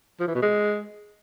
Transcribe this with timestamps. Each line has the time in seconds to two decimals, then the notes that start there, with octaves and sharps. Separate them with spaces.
0.20 F3
0.27 E3
0.35 B2
0.42 G#3